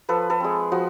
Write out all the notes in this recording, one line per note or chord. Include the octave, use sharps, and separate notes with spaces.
F3 A4 B4
A4 B4
G#3 C4
F3 F#4